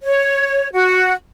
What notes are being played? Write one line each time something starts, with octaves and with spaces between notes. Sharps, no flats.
C#5
F#4